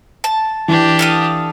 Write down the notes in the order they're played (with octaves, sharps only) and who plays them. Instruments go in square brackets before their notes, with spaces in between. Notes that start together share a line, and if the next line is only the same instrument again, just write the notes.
[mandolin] A5
[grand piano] E3 [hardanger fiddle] D4 G4
[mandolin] A4 F5 D#6